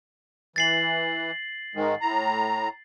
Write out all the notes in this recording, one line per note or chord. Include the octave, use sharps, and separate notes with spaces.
E3 A6 C7 F#7
G#2 D#3 G#3
A2 A#5